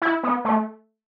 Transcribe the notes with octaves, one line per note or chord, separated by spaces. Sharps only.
E4
B3
A3